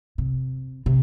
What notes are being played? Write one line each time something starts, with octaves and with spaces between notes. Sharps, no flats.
C3
C3